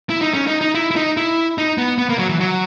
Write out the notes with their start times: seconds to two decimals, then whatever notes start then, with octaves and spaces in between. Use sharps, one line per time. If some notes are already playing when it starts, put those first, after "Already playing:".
0.10 E4
0.21 D#4
0.34 C#4
0.47 D#4
0.61 D#4
0.75 E4
0.91 E4
0.96 D#4
1.17 E4
1.58 D#4
1.78 B3
1.98 B3
2.09 A#3
2.19 F#3
2.29 E3
2.40 F#3